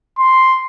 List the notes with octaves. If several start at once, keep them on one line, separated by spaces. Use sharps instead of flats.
C6